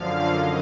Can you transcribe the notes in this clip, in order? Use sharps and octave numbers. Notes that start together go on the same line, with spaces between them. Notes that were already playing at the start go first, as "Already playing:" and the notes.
Already playing: F#2 D3 F3 F5
F#2 D#3 D#5